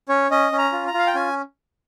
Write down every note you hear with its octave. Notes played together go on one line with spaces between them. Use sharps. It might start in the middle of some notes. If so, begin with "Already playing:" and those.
C#4 C#5
C#4 D#5
C#4
A#5
F4
A#5
F4
F5
G5
C#4 G#5